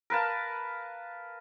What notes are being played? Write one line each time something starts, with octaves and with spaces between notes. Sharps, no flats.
A#4 B4 F5 A5